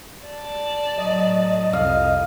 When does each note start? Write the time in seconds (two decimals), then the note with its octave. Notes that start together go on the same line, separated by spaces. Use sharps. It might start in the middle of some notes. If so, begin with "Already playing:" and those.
0.25 D5 A5
0.98 A2 F#3 D#5
1.73 C2 F2 F5